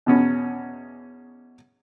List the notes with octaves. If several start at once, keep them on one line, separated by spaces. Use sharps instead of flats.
E2 B2 C#4